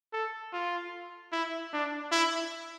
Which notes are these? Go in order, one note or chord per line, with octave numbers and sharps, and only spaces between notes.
A4
F4
E4
D4
E4